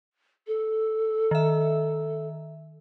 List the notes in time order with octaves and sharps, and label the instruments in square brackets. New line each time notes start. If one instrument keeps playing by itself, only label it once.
[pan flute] A4
[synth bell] D#3 E5